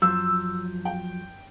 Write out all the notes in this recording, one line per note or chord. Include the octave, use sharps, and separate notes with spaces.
F#2 F3 F#3 E6 G6
G5